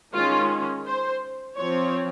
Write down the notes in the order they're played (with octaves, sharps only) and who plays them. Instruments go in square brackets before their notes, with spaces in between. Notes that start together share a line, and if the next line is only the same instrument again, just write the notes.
[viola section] D#3 G#3 C#4 F4
C5
F3 C4 C#5